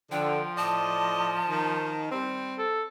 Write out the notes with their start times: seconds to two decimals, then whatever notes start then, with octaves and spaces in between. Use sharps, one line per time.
0.11 D3 F3 G5
0.57 A2 D5 D#5 A5
1.49 D#3
2.11 G3 C4
2.58 A4